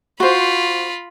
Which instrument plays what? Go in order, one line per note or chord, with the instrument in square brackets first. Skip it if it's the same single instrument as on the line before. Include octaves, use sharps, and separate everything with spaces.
[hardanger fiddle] F4 B5 [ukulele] F#4 C5